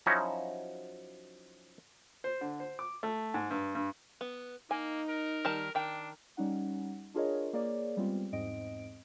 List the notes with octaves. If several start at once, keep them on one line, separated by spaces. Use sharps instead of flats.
F3 F#3 C#4 D#4 E4 F#4
C5
D3
C5
D6
A3
G#2
G2
G2
B3
A#3 D#4 G#5
A#4
D#3 G3 A5
D#3 D4 G5
G3 C#4 D#4 F#5
D4 F4 G#4 A#4 C#5 D#5
A#3 G#4 C#5 D5
G3 G#3 B3 C4 F4
E2 G#2 C4 D#5 D7